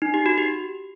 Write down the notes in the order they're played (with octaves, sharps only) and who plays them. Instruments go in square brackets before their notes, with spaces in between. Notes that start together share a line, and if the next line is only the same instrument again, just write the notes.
[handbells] D#4
G4
F#4
G4